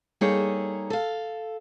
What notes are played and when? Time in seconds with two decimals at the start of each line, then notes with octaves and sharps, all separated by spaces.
0.21 G3 A#3 D#4 G#4 A4 C#5
0.90 A4 F5